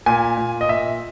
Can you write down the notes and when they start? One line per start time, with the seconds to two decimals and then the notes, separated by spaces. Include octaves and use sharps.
0.06 A#2 G#5
0.37 A#2
0.61 D#5
0.69 A#2 E5